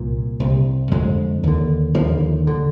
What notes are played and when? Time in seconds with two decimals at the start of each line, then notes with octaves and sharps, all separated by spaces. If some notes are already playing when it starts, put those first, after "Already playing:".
Already playing: C2 A#2
0.40 C2 C3
0.91 F2 D3 G#3
1.43 D#2 D3
1.94 D#2 D3 F3
2.47 D3